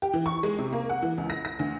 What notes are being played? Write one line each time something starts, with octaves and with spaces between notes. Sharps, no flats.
G4
E3
C#6
G#3
C3
A#3
F#5
E3
C#2
A#6
A#6
D2